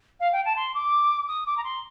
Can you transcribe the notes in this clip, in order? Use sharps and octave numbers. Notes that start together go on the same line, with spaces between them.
F5
G5
A5
C6
D6
D#6
D6
A#5
C6